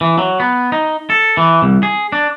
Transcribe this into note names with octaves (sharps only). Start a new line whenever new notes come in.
E3
F#3
B3
D#4
A4
E3
C2
G#4
D4